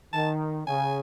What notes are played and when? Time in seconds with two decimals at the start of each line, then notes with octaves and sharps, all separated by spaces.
0.13 D#3 A5
0.66 C#3 G#5